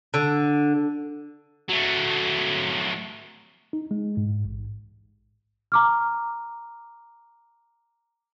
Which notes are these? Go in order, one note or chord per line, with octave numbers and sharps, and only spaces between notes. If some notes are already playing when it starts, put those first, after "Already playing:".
D3
F#3 A3
D#4
G#3
G#2
A1
A#5 D6 F6